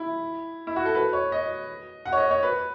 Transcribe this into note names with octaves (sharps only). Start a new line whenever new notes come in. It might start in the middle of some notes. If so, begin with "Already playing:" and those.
Already playing: E4
E4
F#4
A4
B4
C#5
D#5
F#5
C#5
D#5
C#5
B4